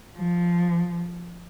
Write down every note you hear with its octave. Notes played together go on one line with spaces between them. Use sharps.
F3